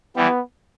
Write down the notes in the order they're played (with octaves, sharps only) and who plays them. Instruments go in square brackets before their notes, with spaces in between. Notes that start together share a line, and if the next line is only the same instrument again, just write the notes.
[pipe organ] E3 G3 [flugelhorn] B3